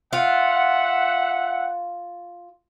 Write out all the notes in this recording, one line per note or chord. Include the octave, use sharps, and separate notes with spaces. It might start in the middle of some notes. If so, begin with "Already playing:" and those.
F4 E5 F#5